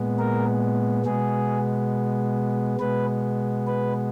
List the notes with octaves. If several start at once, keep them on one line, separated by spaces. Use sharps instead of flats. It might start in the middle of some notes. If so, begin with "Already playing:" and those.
Already playing: A#2 G#3 B3
A#4
B2 G#3 B3 G#4
B2 G#3 B3 B4
B4